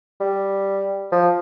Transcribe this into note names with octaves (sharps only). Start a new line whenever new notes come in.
G3
F3